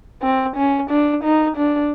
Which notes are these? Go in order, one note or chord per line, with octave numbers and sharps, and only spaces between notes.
C4
C#4
D4
D#4
D4